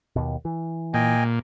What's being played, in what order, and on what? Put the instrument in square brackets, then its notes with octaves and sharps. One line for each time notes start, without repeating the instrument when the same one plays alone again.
[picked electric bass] D#2 B2
E3
[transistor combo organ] A#2 [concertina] D#5 G5 G#5